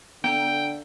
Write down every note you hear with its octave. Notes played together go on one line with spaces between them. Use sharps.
D3 B3 G5 G6